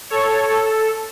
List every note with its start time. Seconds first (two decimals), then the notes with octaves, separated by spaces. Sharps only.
0.10 A4 C#5
0.49 A4